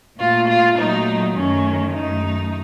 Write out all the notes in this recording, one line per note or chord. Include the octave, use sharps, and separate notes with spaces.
A#2 A3 F4
F4
A#2 F#3 A3 D#4
F#2 D#3 A3 C#4
F#2 D#3 A3 D#4